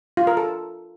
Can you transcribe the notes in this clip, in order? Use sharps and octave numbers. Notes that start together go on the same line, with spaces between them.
F4
A#4
A4